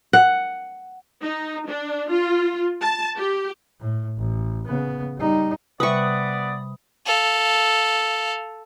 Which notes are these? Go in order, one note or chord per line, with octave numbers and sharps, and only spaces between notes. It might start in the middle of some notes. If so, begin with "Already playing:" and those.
F#5
D#4
D4
F4
A5
G4
A2
A1
C#3 B3
G3 D#4
C3 G3 B3 B4 D5 E5 C#6 D#6
A4 F5